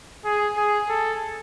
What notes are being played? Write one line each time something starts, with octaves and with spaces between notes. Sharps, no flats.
G#4
G#4
A4